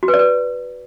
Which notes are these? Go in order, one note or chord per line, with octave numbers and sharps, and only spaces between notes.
F#4
B4
D5
B4